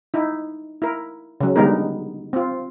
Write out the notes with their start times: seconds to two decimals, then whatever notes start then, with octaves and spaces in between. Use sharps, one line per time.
0.14 D#4 E4
0.82 E4 A#4
1.40 C#3 F#3
1.56 D3 G3 G#3 B3 D#4 A#4
2.33 C4 F4